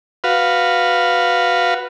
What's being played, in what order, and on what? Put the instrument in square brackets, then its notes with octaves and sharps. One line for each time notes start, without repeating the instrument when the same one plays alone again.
[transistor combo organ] F#4 B4 F5